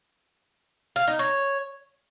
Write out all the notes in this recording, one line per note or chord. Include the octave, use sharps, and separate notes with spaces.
F5
D#4
C#5